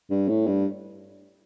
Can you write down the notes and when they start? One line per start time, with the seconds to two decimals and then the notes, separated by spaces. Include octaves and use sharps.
0.11 G2
0.29 A2
0.47 G2